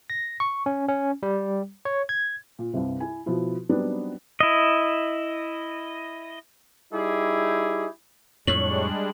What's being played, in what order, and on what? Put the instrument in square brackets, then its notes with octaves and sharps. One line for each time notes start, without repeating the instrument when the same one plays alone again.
[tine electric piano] A#6
C#6
C#4
C#4
G3
C#5
G#6
[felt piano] A#2
C2 G2 C3
E4 G#5
B2 F3 E4
F#3 G3 B3 C4 D4 D#4
[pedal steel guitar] E4 D#5
[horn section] G3 D#4 E4 G4 G#4
[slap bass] F2 A2 [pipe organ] G3 G#3 D4 [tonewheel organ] C#5 C#6 [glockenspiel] F#7